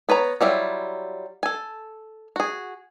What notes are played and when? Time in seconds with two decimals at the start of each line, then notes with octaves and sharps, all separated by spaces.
0.09 B3 B4 C#5 A#5
0.41 F#3 G3 E4 F4
1.43 A4 G#5
2.36 F#4 G#4